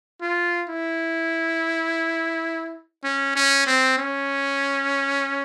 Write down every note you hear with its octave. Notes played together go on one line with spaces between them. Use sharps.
F4
E4
C#4
C#4
C4
C#4